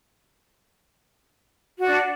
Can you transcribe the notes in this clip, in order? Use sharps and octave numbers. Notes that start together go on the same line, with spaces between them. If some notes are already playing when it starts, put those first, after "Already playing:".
D4 F#4 D5